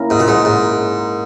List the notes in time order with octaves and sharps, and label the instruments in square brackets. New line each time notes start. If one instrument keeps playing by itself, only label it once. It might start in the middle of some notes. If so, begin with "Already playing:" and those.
Already playing: [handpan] A#3 C#4 E4 A#4
[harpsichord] G#2
A#2
G#2
G#2